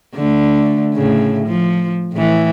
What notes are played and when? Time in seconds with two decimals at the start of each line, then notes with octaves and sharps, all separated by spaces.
0.15 D3 A3
0.94 A2 C#3
1.47 F3
2.13 A2 E3